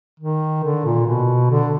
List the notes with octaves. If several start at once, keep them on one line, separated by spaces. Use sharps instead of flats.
D#3
D3
A#2
B2
D3